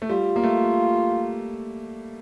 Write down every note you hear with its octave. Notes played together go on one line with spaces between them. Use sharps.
A3
G3 F4
A#3
A3